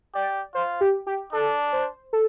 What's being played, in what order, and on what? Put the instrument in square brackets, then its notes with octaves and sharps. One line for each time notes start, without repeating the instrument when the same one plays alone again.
[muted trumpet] G4 [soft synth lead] D5
[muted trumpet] F4 [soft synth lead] C5
[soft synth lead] G4
G4
[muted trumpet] D4 [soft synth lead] A4
[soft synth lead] C5
A4